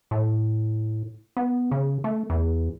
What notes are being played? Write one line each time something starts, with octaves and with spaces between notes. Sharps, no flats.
A2
B3
C#3
A3
E2